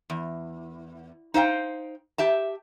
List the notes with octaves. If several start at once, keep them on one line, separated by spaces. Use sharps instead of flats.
E2
D#4 C5 F5 G5
G4 E5 A5